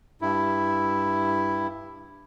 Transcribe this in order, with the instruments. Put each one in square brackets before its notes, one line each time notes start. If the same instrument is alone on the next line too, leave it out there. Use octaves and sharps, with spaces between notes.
[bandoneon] G2 E4